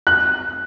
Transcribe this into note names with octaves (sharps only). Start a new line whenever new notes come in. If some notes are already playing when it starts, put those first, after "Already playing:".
F#6